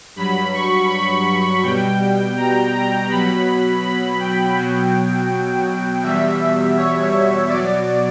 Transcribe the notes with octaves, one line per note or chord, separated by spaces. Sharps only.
G2 F#3 B5
C#6
B5
B2 G3 G5
A#5
A#5
B2 F#3 B5
B5
G5
B2 F#3
E2 B2 G3 E5
C#5
B2 F#3 D5